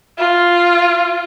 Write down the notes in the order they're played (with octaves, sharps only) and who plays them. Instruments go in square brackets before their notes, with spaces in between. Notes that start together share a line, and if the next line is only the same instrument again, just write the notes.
[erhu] F4